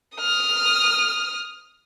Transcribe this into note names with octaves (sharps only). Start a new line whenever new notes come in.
D#6 F6